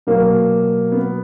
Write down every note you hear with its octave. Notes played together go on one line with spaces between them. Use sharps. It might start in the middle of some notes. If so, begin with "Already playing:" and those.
B2 F#3 A#3
B3